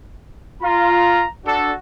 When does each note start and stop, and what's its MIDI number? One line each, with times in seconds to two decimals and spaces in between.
0.62 1.25 65
0.62 1.29 82
1.46 1.71 62
1.46 1.77 66
1.46 1.71 69